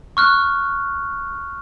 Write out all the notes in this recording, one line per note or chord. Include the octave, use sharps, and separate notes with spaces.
C#6 F6 F#6